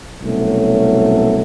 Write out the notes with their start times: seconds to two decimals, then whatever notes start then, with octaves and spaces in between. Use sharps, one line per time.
0.22 C2 B2 F#3 A3 C#4